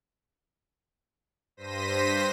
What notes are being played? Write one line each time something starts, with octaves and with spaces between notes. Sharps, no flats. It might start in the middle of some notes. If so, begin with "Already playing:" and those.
G2 C5 A#6 B6 D#7